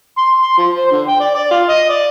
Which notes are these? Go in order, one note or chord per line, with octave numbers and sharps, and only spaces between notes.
C6
C6
F3
C5
D3
G5
D5
D5
F4
D#5
D5